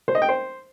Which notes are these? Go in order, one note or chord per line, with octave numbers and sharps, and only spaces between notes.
C5
D#5
G5
C5